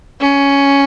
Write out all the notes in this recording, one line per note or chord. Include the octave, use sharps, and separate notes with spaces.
C#4